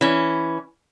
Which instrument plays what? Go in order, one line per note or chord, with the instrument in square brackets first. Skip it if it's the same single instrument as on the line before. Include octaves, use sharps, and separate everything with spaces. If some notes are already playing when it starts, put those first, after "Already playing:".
[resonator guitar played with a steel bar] E3 C#4